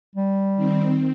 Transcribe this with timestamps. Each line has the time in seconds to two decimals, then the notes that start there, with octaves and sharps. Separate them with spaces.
0.15 G3
0.56 D#3 C4